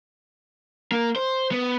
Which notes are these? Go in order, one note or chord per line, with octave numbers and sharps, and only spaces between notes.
A#3
C5
B3